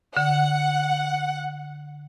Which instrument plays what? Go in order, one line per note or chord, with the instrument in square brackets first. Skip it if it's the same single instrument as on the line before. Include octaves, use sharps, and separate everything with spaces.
[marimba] D3 [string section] F#5